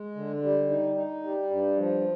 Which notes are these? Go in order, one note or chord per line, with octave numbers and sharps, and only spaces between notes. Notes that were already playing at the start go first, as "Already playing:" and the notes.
Already playing: G#3
D3
G3
D#4
D#4
G3
G2
F3